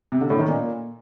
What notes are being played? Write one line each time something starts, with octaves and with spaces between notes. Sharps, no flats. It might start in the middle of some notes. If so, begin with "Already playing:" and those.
C3
D3
A2
D#3
A#2